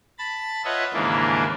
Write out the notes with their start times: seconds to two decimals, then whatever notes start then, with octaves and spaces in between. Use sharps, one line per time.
0.18 A5 B5 A6
0.64 F4 B4 C#5 D#5 E5 F#5
0.94 D#2 G#2 C#3 E3 A#3 D4